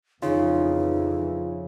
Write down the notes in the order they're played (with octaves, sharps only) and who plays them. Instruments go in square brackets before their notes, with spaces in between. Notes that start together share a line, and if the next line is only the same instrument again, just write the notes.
[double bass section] F2 E3 [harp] C#3 [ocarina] D#4 [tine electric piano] F4